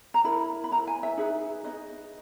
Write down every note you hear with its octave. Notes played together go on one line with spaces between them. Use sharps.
A#5
E4 A#4 B5
B5
E4 A#4 A#5
G#5
E5
D#4 G#4 B4 E5
D#4 G#4 B4 D#5